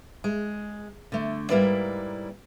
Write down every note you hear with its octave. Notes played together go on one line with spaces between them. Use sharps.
G#3
D3 A3
G#2 G3 A#3 E4 B4 D5